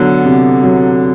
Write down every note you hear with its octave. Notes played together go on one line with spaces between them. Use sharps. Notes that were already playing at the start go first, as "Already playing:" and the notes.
Already playing: D3 F#3 B3
C3
F#3